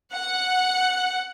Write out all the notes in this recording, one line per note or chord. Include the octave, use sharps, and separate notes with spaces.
F#5